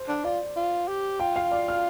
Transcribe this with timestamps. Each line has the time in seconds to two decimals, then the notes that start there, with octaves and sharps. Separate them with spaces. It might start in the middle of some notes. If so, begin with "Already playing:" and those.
Already playing: C5
0.08 D4
0.24 F4 D5
0.56 F4
0.88 G4
1.20 F4 G5
1.36 F5
1.51 D5
1.68 F6